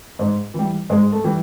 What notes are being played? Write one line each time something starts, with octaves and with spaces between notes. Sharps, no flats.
G#2
E3 G3
G#2 G#3
A3
E3 G3